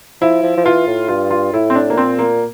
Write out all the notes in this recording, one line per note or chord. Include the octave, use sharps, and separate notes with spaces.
F3 E4
F3
F3
E3 F4
A2
G2 F4
F4
A2 E4
C4
D4
A#3
A#2 C4
A#3